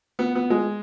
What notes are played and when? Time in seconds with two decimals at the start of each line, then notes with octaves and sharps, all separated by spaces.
0.19 B3
0.35 B3
0.50 G#3